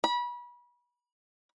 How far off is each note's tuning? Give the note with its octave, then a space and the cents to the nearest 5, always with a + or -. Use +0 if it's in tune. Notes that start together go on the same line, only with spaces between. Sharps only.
B5 -30